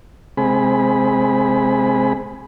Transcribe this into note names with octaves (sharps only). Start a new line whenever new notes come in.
C3 G#3 C4 G#4 B5